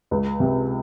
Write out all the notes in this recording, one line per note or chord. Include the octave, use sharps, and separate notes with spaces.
C#2
C3